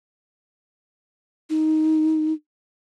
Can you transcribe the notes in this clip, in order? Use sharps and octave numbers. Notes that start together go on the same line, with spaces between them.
D#4